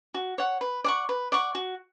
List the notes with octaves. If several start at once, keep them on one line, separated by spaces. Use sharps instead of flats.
F#4
C#5 F#5
B4
D5 F#5 C#6
B4
D5 F#5 C#6
F#4